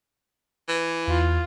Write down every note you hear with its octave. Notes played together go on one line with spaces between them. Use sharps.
E3
E2 F4